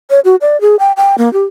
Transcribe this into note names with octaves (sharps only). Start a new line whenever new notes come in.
C#5
F#4
D5
G#4
G5
G5
A#3
G4